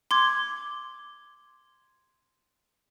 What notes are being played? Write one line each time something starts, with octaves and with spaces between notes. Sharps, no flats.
C6 D6 G#6